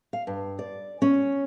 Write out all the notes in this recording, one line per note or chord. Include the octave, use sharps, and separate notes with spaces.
F5
G2
D5
C#4